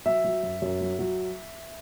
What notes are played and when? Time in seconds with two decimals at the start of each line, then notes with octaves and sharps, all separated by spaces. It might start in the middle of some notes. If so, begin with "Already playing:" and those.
0.06 F#3 E5
0.24 F#3
0.43 F#2
0.62 F#2
0.81 F#3
0.99 F#3